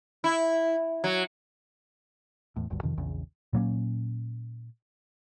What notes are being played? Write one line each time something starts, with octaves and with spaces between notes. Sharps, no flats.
E4
F#3
E2 A2
F1 D2 G2
F2 C3 D#3 F3
A#1 E2 C#3
A#2 F#3 A#3 C#4